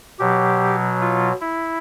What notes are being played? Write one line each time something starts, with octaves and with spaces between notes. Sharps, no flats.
B2 F#3 G4
F4
E4